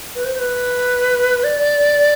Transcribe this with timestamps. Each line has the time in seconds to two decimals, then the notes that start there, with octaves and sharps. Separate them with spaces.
0.15 B4
0.25 C5
0.35 C5
0.39 B4
1.44 D5